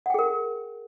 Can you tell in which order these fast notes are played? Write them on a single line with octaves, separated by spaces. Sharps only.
F#5 G5 G#4 A#4